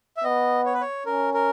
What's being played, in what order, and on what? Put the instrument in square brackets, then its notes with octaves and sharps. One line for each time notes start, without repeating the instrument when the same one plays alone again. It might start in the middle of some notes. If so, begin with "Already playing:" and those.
[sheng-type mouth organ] E5
[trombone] B3 [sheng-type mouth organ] D#5
[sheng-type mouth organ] C#5
B4
C#5
[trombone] C#4 [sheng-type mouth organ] A#4
[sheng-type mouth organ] A#4